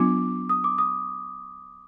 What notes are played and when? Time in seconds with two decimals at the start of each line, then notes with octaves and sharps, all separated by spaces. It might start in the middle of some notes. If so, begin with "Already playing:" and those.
Already playing: F#3 B3 D4 F4 D6
0.49 D#6
0.64 D6
0.78 D#6